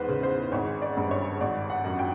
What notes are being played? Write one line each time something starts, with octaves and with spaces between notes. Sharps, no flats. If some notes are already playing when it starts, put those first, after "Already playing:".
Already playing: E2 G#2 B4 C5
C#3
C5
G#1 C#5
D5
G2
C#5
G#1 D5
F#5
F#2
G5